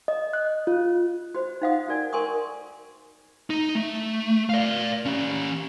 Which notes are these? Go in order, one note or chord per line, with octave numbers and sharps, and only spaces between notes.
D#5
F#6
F4
F#4 C5
D#4 C5 F5 F#5 D#6
D#4 F#4 A#4 D5 G#5
A#4 G#5 C6 C#6 D#6
D#4
A3
D5 F5
C#4 G4